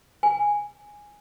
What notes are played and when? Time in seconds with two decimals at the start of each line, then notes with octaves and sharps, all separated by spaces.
0.23 G#5